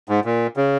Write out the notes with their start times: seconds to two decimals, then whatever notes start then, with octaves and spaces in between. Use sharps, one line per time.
0.09 G#2
0.25 A#2
0.57 C#3